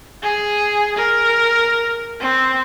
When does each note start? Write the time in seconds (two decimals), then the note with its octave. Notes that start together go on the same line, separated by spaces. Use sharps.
0.23 G#4
0.97 A#4
2.21 C4